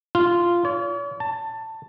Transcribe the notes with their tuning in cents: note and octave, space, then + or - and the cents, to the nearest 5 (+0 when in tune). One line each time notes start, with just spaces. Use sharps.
F4 -10
C#5 +45
A5 +15